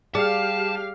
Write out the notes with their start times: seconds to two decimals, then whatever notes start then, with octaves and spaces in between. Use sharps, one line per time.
0.15 G3 G4 G#4 F5 A5